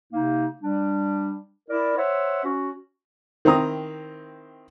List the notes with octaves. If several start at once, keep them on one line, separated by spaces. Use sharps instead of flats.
C3 A#3 D#4
G3 D4
E4 A#4 D5
C5 C#5 E5 F#5
C#4 F#4
D#3 C4 E4 A#5 D#6